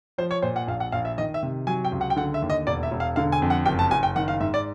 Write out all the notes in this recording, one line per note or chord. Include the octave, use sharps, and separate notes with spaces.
F3 C5
C#5
A#2 C5
F#5
A#1 F5
F#5
A#1 F5
E5
D#3 D#5
E5
C3
F#3 G#5
G5
C#2
F#5
G5
D3 F#5
E5
D#2
D#5
E1 D5
E5
E1
F5
D3 F5
G#5
F2
F#5
F#1 G5
A5
F#1 G#5
G5
D#3 F#5
F5
G#2 E5
D5